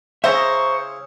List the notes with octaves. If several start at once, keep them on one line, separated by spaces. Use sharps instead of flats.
C#3 E4 C5 E5 A#5 C#6